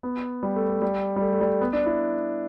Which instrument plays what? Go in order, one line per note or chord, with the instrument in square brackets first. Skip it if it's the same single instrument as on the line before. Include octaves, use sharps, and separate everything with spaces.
[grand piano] B3
G3
A3
A3
G3
G3
A3
A3
G3
B3
D4
E4